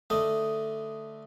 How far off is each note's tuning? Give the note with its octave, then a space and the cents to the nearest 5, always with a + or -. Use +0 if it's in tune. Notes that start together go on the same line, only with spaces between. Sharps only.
D3 +0 A3 +0 D#5 +0